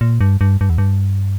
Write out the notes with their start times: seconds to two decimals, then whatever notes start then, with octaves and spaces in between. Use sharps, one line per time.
0.01 A#2
0.21 G2
0.41 G2
0.61 G2
0.70 E2
0.78 G2